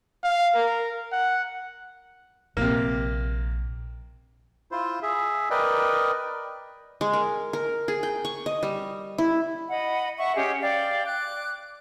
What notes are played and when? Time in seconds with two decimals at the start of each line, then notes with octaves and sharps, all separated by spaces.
0.24 F5
0.55 A#4
1.12 F#5
2.57 A#1 C3 A#3
4.71 E4 F4 C5
5.03 G#4 E5
5.51 A#4 B4 D5 D#5 G5
7.01 G#3
7.13 A#4
7.53 A#4
7.88 G#4
8.03 G5
8.25 C#6
8.46 D#5
8.63 G3
9.18 E4
9.70 D#5 F#5 B5
10.17 E5 F#5 C#6
10.35 C#4 G4 G#4 D#5
10.61 D5 F5 G5
11.05 D6 F#6